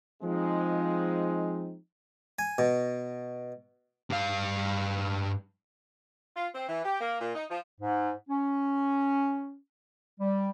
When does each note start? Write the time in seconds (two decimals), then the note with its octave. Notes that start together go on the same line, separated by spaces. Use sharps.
0.23 F3 G#3 C4 D#4
2.39 G#5
2.58 B2
4.11 G2 F5
6.35 F4
6.54 C4
6.67 E3
6.84 G4
7.01 A#3
7.20 A#2
7.34 D#4
7.50 F3
7.81 G#2
8.29 C#4
10.19 G3